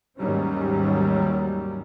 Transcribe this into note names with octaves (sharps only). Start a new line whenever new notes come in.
D#2 G#2 D#3 F#3 G3 C#4